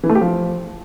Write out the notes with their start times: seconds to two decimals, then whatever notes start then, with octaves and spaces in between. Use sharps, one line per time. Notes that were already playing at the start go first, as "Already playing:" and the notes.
0.04 E3
0.09 A3
0.15 G4
0.21 F3